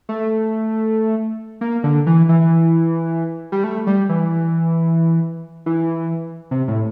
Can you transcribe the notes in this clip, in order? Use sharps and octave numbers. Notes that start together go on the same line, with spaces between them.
A3
A#3
D3
E3
E3
G3
A3
G3
E3
E3
C3
A2